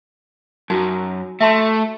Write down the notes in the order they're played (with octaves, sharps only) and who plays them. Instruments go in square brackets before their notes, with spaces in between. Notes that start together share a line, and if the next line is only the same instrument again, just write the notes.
[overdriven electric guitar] F#2 [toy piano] D#4 F#4 G#5
[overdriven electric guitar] A3 [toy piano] E5 A5 C6